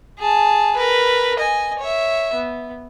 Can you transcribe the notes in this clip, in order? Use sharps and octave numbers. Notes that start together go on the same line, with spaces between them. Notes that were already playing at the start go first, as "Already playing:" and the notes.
G#4 A5
A#4 B4
D#5 G#5
C#5 E5
B3